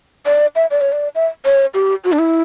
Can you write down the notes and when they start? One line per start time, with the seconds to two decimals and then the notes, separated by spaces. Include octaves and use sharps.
0.26 D5
0.56 E5
0.71 D5
0.81 C#5
0.92 D5
1.15 E5
1.45 C#5
1.74 G4
2.04 F#4
2.12 D4
2.19 E4